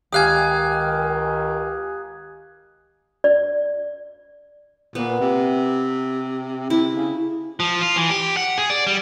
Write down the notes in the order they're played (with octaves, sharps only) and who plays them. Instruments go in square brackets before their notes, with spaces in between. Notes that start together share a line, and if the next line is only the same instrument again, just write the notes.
[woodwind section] C#2 D#3 [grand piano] G4 F5 G#5 [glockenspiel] D#6 F#6 G#6
[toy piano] D5
[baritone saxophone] A#2 [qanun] B3
[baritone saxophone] C3
[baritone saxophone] C3 [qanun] E4
[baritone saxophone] C#3
[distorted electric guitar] F3
F4
E3
G4
F#5
G#4
D5
G3